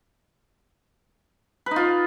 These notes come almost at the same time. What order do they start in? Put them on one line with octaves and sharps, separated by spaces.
B4 D#4 F4